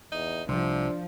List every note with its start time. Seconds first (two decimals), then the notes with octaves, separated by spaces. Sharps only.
0.12 E2 D#4
0.49 C2 C3 F3 D4